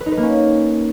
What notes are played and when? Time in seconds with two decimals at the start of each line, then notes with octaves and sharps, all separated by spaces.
0.01 B4
0.06 D#4
0.12 B4
0.17 A#3
0.23 C#4